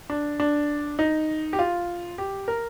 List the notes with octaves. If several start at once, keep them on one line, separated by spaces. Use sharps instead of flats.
D4
D4
D#4
G4
F4
G4
A#4